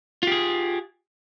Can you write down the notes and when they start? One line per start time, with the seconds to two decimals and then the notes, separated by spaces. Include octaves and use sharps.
0.23 F4
0.27 G4
0.32 G#4